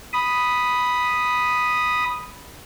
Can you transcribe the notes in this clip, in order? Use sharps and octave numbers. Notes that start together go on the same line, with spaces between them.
B5 D#6